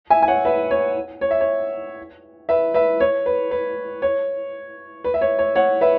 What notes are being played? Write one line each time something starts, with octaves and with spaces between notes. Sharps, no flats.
E5 G#5
G#5
C#5 F#5
B4 E5
C#5
C#5
E5
C#5
B4 E5
B4 E5
C#5
B4
B4
C#5
B4
E5
C#5
C#5
C#5 F#5
B4 E5